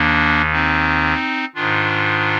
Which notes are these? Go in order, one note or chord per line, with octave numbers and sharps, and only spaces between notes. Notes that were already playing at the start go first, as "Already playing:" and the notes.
Already playing: D#2 D#3 A#3 D4
C4 D#4
G#2 D#3 D4 F4